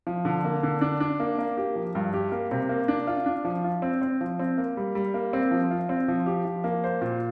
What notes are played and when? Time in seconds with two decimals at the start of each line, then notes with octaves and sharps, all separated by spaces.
0.07 F3
0.25 D3
0.44 A#3
0.63 D3
0.81 D4
1.00 D4
1.20 A#3
1.38 A#3
1.57 G4
1.76 F3
1.95 G2
2.14 G4
2.32 A#3
2.51 C3
2.69 A#3
2.88 D4
3.07 F4
3.26 D4
3.45 F3
3.64 F4
3.82 C4
4.02 C4
4.21 F3
4.39 C4
4.58 A#3
4.77 G3
4.95 G3
5.14 A#3
5.33 C4
5.51 F3
5.71 F4
5.89 C4
6.08 F3
6.26 G4
6.45 F3
6.64 A#3
6.84 C5
7.01 A#2